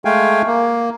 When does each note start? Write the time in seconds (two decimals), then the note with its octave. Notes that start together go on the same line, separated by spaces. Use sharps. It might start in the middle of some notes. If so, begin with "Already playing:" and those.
0.05 G#3 A3 F5 G5 G#5
0.47 A#3